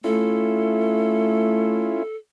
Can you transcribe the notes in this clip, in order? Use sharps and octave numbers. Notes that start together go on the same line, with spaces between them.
A3 C#4 E4 F4 A4